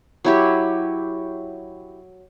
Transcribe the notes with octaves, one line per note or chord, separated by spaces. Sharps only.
F#3 E4 G4